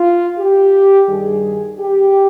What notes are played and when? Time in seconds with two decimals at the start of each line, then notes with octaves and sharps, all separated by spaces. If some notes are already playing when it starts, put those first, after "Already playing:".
Already playing: F4
0.38 G4
1.09 G2 D#3 G3 G#4
1.80 G4